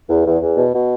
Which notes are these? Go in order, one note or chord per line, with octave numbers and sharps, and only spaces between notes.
E2
E2
E2
B2
B2